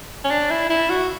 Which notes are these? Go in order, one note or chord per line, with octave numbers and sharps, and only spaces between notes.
C#4
D4
E4
E4
F#4